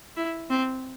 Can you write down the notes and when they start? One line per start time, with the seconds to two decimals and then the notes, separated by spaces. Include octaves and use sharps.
0.16 E4
0.50 C4